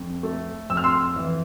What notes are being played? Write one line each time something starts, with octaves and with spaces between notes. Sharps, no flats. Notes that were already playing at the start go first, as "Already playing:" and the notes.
Already playing: F2
A3
F2 E6
F6
C6 E6
E3